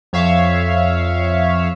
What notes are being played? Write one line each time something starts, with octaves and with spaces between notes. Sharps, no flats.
F2 C#5 E5 F5